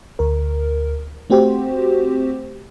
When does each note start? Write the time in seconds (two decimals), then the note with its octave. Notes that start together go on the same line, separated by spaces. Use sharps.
0.19 D2 A#4
1.30 A3 C4 F#4 G4 C5